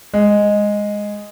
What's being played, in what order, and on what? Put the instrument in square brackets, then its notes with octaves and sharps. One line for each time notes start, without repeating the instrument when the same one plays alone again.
[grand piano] G#3